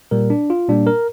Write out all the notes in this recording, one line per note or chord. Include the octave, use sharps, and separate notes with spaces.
A#2 G3 A#3 A#4
D4
F4
A#2 G3 A#3 D4
A#4